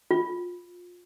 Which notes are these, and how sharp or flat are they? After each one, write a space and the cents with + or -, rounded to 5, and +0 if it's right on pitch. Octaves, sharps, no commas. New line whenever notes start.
F4 +20